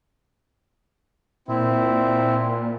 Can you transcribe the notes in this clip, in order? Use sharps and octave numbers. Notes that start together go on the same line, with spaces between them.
A#2 C4 E4